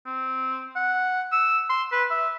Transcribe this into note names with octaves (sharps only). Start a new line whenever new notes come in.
C4
F#5
E6
C6
B4
E5